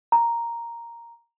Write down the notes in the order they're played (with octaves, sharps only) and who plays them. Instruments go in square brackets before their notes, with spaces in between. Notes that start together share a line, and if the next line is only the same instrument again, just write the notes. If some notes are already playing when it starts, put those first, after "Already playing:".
[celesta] A#5